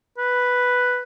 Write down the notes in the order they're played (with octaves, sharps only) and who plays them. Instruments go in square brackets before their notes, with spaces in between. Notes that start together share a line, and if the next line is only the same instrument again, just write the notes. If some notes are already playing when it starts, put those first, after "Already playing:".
[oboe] B4